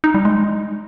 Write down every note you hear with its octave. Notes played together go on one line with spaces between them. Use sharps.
D#4
G3
G#3